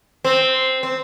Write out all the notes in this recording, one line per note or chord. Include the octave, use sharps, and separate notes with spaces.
C4
C4